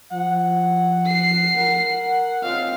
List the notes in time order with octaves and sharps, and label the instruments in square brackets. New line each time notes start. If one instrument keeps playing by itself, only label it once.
[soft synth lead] F3 [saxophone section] F#5
[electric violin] C7
[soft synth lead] A#4
[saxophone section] C#3 G#3 C4 [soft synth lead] F4 [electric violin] F5